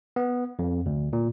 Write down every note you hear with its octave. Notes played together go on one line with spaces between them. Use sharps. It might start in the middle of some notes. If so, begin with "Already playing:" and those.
B3
F2
D2
A#2